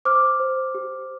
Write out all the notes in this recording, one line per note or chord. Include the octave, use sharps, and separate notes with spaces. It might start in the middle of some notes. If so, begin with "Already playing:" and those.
C5 D6 F6
C5
G4